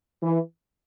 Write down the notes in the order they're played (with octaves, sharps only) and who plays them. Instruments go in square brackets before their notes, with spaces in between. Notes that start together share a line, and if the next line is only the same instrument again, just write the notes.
[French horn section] E3